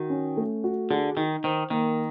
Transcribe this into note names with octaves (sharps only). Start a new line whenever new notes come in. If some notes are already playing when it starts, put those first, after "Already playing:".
Already playing: D#3 F#4
C#4
A3
F#4
D3 G#4
D#3 D#4
D#3 C5
D#3 A#3